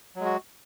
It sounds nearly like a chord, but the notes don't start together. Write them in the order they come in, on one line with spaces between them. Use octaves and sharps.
F#3 G#3 F#4